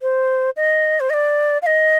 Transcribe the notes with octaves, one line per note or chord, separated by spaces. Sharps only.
C5
D#5
C5
D#5
D5
F5
D#5